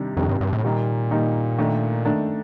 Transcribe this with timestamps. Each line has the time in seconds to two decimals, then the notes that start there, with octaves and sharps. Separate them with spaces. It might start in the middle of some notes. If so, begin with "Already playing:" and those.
Already playing: C3 D#3 G3 D4
0.17 F2 C3 D#3 G3 D4
0.29 G2
0.41 G2
0.53 A2
0.64 A#2 D#3 G3 A#3 D#4
1.11 D#3 G3 A#3 D#4
1.58 D#3 A3 D4
2.05 D#3 A3 D4